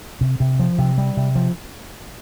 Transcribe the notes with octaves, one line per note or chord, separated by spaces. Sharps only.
C3
C3
F3
C3
G3
C3
F3